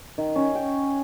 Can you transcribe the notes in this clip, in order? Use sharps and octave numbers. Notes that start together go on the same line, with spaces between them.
D#3
C#4
G5